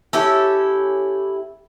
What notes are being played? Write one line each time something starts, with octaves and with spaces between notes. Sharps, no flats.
C#4 E4 G4 A4